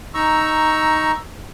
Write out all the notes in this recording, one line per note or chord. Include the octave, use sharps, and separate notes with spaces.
D#4 A#5 C#6 E6